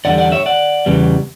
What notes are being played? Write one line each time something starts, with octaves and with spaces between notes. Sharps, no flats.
E2 D3 G3 D5 F#5
D5 F#5
C#5 E5
D5 F#5
E2 C#3 G3 B3